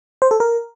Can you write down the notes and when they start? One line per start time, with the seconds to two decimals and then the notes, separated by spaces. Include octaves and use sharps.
0.22 C5
0.31 A4
0.40 A#4